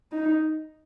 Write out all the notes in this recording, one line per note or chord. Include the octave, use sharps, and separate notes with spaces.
D#4